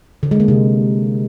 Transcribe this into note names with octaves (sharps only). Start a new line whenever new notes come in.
D3
G#3
A#3
C3